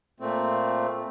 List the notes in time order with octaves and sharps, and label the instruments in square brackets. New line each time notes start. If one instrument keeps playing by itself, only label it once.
[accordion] A#2 A3 C4